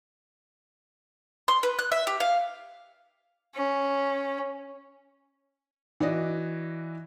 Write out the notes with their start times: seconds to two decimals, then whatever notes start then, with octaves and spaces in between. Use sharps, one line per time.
1.48 C6
1.63 B4
1.79 F#6
1.92 E5
2.07 G4
2.20 F5
3.55 C#4
6.00 E3 F#4 D5 D#5